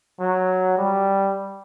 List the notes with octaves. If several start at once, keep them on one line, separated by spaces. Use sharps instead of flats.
F#3
G3